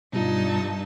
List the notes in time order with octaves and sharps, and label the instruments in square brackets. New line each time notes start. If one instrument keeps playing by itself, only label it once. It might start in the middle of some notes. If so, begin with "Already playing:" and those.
[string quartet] G2 D#4 A5 [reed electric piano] B2 G3 F4